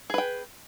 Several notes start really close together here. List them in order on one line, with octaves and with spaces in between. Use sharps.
G#4 B4 G5